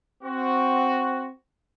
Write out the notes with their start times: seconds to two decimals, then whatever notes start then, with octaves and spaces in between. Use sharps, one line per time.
0.24 C4 F#4